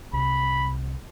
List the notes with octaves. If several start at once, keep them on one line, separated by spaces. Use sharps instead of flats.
C2 C3 B5